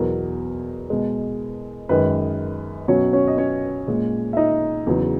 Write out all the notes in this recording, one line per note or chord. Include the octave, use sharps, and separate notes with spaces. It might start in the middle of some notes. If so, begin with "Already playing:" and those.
Already playing: E2 B2 F#3 A#4
B2 G#3
F#2 D#3 G#3 B4
B2 F#3 C#4 C#5
C#4 C#5
D#5
C#4 C#5
A#2 G#3
E5
D#4 D#5
E2 C#3 F#3